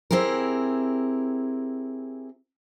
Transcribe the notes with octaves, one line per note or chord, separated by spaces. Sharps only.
C4 E4 G4 G#4 A#4